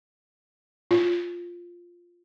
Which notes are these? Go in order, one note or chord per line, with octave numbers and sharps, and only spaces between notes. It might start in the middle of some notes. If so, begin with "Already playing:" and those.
F4